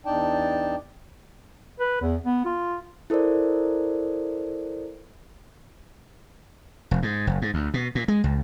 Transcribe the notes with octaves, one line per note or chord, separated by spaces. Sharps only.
E2 D4 D#4 D5 G5 A5
B4
E2
B3
F4
E4 A4 A#4 C5 D5
F1
G#2
F#1
G#2
D2
B2
A#2
G#3
C#2